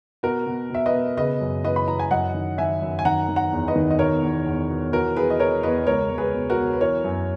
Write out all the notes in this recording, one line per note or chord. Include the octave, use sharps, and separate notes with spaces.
B2 F#4 A#4
B2
B2 E5
B4 D#5
B2
C#3 B4 D#5
F#2
E3 B4 D#5
B5
E3 A#5
G#5
F#2 D#5 F#5
D#3
D#3 E5 G#5
F#2
G#5
D#3 F#5 A#5
D#3
F#5 A#5
E2
B4 D#5
D#3
D#5
B2 A#4 C#5
E2
E2
B2
E3 F#4 A#4
E3 G#4 B4
D#5
E3 A#4 C#5
E2 B4 D#5
C#2 A#4 C#5
C#2
G#4 B4
B2
F#4 A#4
B2
B4
E3 A#4 C#5
F#2